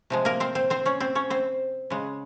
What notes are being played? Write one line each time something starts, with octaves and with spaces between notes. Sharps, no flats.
C3 F3 G#3
A#3 A#4
C4 C5
C4 C5
C4 C5
C#4 C#5
C4 C5
C#4 C#5
C4 C5
C#3 G#3